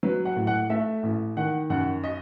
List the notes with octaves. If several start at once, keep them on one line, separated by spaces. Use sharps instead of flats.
F#3 B4
F#5
A2
F#5
A3 E5
A1
D#3 F#5
F#2 F#5
D#5